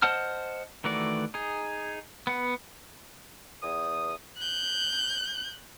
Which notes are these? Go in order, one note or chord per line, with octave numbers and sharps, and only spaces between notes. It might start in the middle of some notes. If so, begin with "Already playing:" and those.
C5 D#5 F#5 A5 F6
D#3 E3 A3 F#4 D5
D#4 G#4
B3 F#5
E2 D#6
F#6 G6